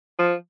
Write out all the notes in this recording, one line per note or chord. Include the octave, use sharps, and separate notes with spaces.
F3